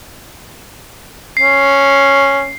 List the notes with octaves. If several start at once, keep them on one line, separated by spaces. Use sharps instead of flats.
C#4 C7